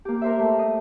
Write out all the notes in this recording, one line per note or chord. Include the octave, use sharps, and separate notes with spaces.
A#3 G4
A#4 C5 E5
A3
D#5